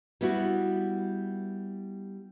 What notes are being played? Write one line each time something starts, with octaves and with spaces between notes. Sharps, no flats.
G3 B3 E4 F#4